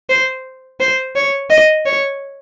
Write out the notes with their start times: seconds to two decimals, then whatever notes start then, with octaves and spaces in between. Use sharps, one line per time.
0.09 C5
0.80 C5
1.16 C#5
1.50 D#5
1.86 C#5